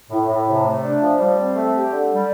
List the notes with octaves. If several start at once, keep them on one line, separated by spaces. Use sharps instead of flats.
A2
A2
C3
A3
D4
F3
G3
C4
A3
G4
D3
G3